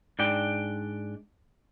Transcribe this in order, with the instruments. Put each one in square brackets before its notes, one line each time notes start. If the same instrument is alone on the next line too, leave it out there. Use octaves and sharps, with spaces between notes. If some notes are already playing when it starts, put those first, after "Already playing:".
[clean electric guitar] G#2 D4 D5 G5